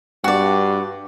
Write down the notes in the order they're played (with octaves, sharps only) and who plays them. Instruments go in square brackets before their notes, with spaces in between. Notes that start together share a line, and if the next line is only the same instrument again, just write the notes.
[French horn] G2 [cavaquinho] F#4 D5